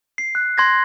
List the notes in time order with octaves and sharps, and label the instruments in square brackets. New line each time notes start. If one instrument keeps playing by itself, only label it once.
[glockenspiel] C7
F#6
C6 G#6 A#6